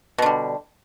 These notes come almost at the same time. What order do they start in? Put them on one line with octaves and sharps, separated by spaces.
B2 D3 G3